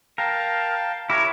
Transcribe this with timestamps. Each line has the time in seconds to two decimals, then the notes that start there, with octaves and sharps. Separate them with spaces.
0.18 A#4 F5 G5 A5
1.10 E4 G4 A#4 C#5 D6